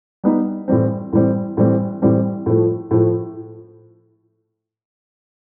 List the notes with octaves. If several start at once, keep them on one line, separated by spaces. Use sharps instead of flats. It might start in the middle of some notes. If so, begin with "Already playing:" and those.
G3 B3 D#4
A2 E3 G3 C4
A2 E3 G3 C4
A2 E3 G3 C4
A2 E3 G3 C4
A2 F3 A3
A2 F3 A3